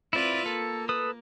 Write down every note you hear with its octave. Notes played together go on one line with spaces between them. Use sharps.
C4 E4 F4 B4 D5
A#3 A4
A4 B4 D#6